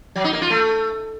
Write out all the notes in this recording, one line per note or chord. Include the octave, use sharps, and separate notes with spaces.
F#3
D#4
A#3
F4
A3